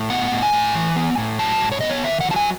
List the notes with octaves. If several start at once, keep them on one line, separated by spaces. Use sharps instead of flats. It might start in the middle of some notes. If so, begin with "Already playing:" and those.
Already playing: A2
B3 F#5
A2
G#5
A2
E3
B3
A2
F#3 A5
G#2
C#5
B3 D#5
C#5
D#3 E5
F#3 F#5
A5
G#5